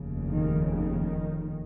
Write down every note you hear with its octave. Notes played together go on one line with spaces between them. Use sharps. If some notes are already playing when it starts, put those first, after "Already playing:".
Already playing: F1 D#2 C#3
D#3
D#3